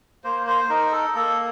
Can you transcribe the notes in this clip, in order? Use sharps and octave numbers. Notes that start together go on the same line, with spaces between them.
A#3 C5
C5
D#4 A#4
A4
A#3 A4